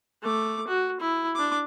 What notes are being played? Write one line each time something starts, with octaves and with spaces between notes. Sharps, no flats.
A3 D6
F#4
E4
D4 D6